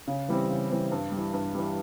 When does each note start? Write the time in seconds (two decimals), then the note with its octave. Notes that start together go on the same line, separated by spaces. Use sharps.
0.08 C#3
0.28 E3 G3 C4
0.50 C#3
0.70 E3 G3 C4
0.92 G2
1.12 G3
1.17 E3
1.34 G2
1.55 E3 G3